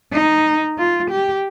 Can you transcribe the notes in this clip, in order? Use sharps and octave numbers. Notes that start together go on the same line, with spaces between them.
D#4
F4
G4